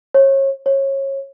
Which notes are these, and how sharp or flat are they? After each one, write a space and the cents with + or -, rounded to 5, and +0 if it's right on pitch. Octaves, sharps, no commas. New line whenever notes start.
C#5 -30
C#5 -25